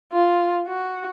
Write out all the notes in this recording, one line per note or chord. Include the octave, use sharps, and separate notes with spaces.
F4
F#4